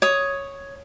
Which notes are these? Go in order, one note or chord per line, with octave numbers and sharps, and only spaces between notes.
C#5 D#6